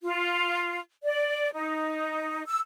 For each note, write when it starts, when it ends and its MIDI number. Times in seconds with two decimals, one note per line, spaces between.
0.03 0.79 65
1.03 1.53 74
1.54 2.43 63
2.46 2.59 88